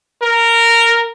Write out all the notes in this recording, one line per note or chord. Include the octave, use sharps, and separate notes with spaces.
A#4